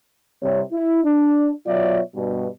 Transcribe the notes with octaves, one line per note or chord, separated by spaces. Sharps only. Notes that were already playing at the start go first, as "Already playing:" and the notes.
C2 C3 C#5
E4
D4
B2 F#3 F4 C#5 D5 E5
G2 B2